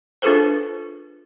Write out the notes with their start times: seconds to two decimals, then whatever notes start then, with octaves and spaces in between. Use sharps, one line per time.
0.22 D4 F4 G#4 A4 B4 C5